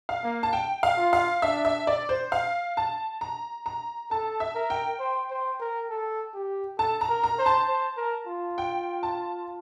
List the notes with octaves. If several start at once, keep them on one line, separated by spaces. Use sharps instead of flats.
F5
A#3
A5
G5
F5
F4
F5
D4 E5
E5
D5
C5
F5
A5
A#5
A#5
A4 A5
E5
A#4
G5
C5
C5
A#4
A4
G4
A4 A5
A#5
A#4
A#5
C5
A5
C5
A#4
F4
G5
A5